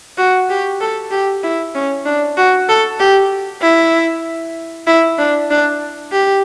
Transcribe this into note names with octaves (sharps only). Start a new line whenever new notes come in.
F#4
G4
A4
G4
E4
C#4
D4
F#4
A4
G4
E4
E4
D4
D4
G4